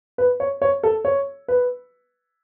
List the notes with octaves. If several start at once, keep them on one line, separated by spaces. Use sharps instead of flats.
B4
C#5
C#5
A4
C#5
B4